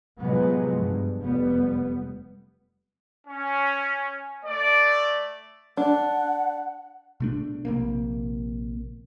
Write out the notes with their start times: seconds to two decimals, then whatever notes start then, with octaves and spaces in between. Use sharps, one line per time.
0.19 C3 F3 F#3 G#3 B3
0.76 G2
1.23 F1 G3 B3
3.27 C#4
4.45 A3 D5
5.77 D4 F#5
7.20 B2 A3 D4
7.65 A#1 C3 A#3